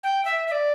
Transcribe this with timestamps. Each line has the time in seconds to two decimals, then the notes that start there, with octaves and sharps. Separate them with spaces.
0.03 G5
0.25 E5
0.47 E5
0.52 D5